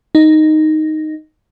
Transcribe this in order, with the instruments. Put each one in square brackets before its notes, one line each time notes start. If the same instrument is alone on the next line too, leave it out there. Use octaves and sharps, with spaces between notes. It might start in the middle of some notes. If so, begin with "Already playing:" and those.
[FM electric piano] D#4